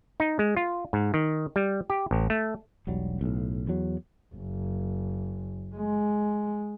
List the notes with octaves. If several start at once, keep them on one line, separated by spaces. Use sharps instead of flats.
D#4
G#3
F4
G#2
D#3
G3
G4
A1
A3
E1 B1 F#3 G3
B1 A2
E2 F#3
F#1
G#3